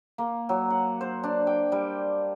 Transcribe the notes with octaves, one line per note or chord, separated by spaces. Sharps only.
A#3
F#3
F#5
C5
D4
G5
G3